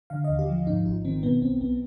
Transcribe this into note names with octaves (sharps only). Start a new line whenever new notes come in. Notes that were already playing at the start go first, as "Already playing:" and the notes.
D3 F5
D#2 D#5
G4
F3
G#2 D#4
G#1 F4
D#3 C4
B2 B3
B1 C4
B1 B3